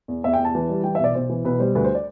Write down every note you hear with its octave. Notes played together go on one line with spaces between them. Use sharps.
E2
E2 E5
G5
E2
A5
E3
G3
E3 G5
E5
B1 D5
B1 C5
E3
B1 B4
G3 C5
D2 B4
C5
D5